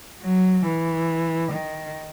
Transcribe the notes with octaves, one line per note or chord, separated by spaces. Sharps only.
F#3
E3
D#3